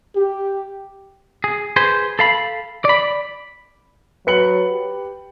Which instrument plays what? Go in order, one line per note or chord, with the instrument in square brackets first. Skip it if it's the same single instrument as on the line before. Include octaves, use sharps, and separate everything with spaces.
[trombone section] G4
[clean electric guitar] G#4
G#4 B4 C5
A4 F5 B5
D5 B5
[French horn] F#3 [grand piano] B4 C#7 F#7
[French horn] G4